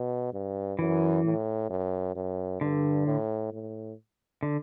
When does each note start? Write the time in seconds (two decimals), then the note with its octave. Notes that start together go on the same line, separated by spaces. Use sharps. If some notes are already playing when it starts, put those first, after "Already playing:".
Already playing: B2
0.33 G2
0.79 F#2 E3
1.25 A2
1.70 F#2
2.15 F#2
2.61 G2 D3
3.06 A2
3.52 A2
4.43 D3